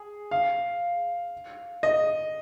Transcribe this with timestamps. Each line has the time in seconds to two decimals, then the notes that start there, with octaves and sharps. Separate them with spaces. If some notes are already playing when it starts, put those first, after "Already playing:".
Already playing: G#4
0.31 F5
1.83 D#5